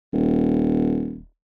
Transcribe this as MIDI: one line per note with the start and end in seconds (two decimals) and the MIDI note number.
0.13 1.23 27